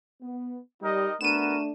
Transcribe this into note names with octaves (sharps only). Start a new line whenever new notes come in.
B3
G3 D#4 A#4 D#5
A3 B3 D4 F#4 A#4 D#7 E7